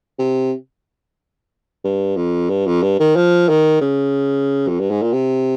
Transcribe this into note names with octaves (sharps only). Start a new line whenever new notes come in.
C3
G2
F2
G2
F2
G2
D#3
F3
D#3
C#3
F2
G2
G#2
A#2
C3